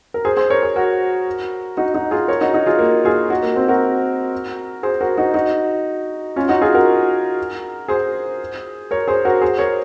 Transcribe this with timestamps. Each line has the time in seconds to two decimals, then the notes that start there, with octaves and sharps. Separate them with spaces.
0.14 A#4
0.25 G#4 C5
0.37 G#4 C5
0.50 A#4 C#5
0.63 G#4 C5
0.76 F#4 A#4
1.77 D#4 F#4
1.94 D#4 F#4
2.11 F4 G#4
2.28 A#4 C#5
2.41 D#4 F#4
2.53 D#4 F#4
2.66 F4 G#4
2.79 A#3
3.05 F4 G#4
3.30 D#4 F#4
3.43 A#3
3.56 C4
3.68 F#4 A#4
4.83 G#4 C5
5.01 F#4 A#4
5.17 D#4 F#4
5.34 D#4 F#4
6.36 C#4 F4
6.48 D#4 F#4
6.61 F4 G#4
6.75 F#4 A#4
7.88 G#4 C5
8.91 A#4 C#5
9.08 G#4 C5
9.25 F#4 A#4
9.41 G#4 C5
9.58 A#4 C#5